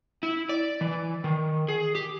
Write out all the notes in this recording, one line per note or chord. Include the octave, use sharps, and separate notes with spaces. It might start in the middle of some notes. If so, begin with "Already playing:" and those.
E4
D5
E3
D#3
G#4
G4